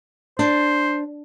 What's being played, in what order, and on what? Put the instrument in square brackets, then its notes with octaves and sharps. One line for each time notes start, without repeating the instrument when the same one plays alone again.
[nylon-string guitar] D4 [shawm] C5